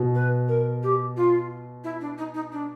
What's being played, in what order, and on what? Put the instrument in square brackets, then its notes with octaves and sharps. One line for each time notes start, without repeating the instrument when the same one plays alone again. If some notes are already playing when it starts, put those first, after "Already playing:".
Already playing: [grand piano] B2
[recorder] B4
A#4
G4
F4
E4
D4
D#4
D#4
D4